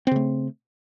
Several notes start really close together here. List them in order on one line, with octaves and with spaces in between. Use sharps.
C4 C#3 A3